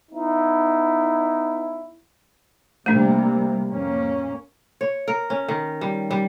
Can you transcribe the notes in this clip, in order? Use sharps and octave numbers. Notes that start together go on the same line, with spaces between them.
B3 D#4 E4
C3 G3 A3 A#3 D4
F2 A#3 C#4
C#5
A#4
C#4
D#3
G3
G3